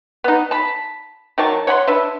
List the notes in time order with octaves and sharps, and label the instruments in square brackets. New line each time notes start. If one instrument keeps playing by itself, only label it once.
[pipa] B3 D#4
A5 B5
D#3 F#3 A5 C#6
C#5 F#5 B5 C6
D4 B4 E5